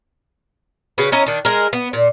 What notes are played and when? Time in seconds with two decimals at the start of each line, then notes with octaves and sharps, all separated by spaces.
0.98 C#3 F#4 B4
1.12 C#4 E4 D#5 A#5
1.26 D#3 D4
1.45 G#3 A#4
1.73 B3
1.93 A#2